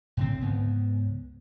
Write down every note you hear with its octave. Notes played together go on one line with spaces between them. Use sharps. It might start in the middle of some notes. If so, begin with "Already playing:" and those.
A2 D3 C4
C#2 G#2 B3